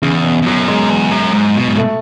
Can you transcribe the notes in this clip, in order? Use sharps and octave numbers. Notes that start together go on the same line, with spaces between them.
E2 C#3
B2
E2
F#2 F#3
G#3
E2
F#2
G#2
B2
G#2
A3